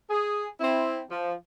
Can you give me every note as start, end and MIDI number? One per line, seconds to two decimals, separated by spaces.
0.10 0.48 68
0.60 1.00 60
0.60 1.00 64
1.11 1.35 53